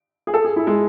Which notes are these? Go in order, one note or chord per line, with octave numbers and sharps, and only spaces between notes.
G#4
A4
G#4
E4
G#3